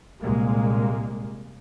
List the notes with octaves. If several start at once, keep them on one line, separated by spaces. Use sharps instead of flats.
C2 A#2 G#3 A#3